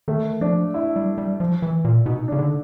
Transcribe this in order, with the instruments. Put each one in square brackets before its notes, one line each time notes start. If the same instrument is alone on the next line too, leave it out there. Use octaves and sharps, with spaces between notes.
[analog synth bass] D#3 [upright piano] A3
[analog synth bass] F3 [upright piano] D4
[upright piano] E4
[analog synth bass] G3
G3
F3
E3
A#2
[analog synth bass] B2 [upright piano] D#4
[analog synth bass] C#3 [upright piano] D4
[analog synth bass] D3